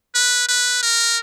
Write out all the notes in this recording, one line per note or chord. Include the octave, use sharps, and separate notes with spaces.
B4
B4
A#4